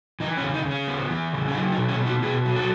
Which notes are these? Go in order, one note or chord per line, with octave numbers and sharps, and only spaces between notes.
E3 D#4
C#4
C#3
D#4
C#3
C#4
B3
E3
C#3
C#4
F#3 D#4
D#4
B2
C#4 E4
B3
D#4 F#4
B2 E4 G#4
F#3
F#4 A4